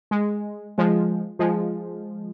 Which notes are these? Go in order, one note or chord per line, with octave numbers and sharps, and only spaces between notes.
G#3
F3 G#3
F3 G#3